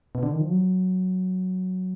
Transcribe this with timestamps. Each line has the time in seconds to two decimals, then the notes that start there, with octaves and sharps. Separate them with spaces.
0.15 B2
0.23 D3
0.32 D#3
0.41 F3
0.50 F#3